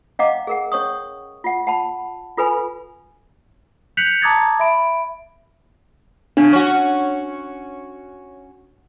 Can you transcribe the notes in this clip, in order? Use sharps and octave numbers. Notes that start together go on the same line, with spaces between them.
C#4 D#5 F5 F#5 A#5 D6
G#4 A#4 F#5
C#4 C#5 C#6 D#6
F4 F#5
F#5 A5 B5
F4 A4 B4 G#5 B5
F#6 G6 B6 C#7 F7 F#7
A5 A#5 D6 D#6 G#6 A6
E5 B5 D7
C#3 D4
C#4 F#4